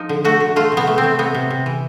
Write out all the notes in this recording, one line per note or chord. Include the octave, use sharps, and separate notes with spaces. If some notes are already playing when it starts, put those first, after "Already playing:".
Already playing: F3 D#4
D3
A3 F#4
D3
A3 F4
C3
B3
A3
C4
A3
C3 B3
C3
C3
E3